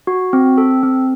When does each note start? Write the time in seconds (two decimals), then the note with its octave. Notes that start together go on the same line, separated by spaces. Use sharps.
0.07 F#4
0.33 C4
0.58 A4
0.83 C4